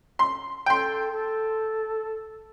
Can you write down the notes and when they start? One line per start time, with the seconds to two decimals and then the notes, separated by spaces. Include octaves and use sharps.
0.19 C6
0.66 A4 G5 C6
1.11 A4